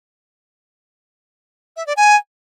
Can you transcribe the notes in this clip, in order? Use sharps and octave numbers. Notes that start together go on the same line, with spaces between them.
E5
D5
G#5